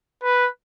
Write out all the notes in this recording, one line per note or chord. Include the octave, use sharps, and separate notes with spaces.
B4